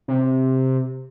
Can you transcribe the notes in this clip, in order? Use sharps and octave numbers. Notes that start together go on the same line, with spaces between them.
C3